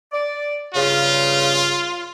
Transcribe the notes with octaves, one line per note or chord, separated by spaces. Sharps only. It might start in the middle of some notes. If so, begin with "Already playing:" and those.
D5
G2 C#3 F4